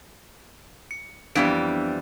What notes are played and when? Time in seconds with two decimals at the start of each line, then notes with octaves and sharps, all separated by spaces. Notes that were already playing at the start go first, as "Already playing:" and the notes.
0.91 C#7
1.35 F2 E3 G3 B3 D4 D7